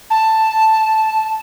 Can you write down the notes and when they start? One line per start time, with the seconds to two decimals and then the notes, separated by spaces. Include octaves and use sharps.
0.10 A5